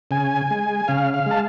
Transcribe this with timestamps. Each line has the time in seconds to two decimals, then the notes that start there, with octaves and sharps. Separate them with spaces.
0.11 C#3 G#5
0.50 G#3
0.88 C#3 F5
1.14 F5
1.26 G#3 A5